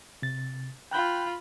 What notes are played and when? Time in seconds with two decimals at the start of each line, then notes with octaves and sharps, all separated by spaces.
0.22 C3 A6
0.91 F4 G5 B5 F#6 G6